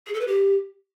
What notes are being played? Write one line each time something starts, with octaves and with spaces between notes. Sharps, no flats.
G#4
A4
B4
G4